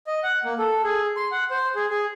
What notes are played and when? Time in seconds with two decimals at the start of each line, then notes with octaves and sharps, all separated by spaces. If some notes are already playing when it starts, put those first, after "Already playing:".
0.07 D#5
0.24 F#5
0.45 A#3
0.59 A4
0.84 G#4
1.16 C6
1.31 F#5
1.51 C5
1.75 G#4
1.90 G#4